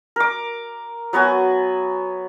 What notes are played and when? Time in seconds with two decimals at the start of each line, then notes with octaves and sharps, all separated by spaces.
0.16 A#4 D6
1.13 F#3 B3 F#4 G#5